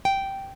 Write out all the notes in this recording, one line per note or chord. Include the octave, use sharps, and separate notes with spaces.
G5